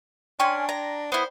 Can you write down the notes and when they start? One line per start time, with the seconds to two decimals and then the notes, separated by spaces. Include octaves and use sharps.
0.40 C#4 D4 G5 G#5 C6
0.69 D5 A#5
1.12 B3 E4 C5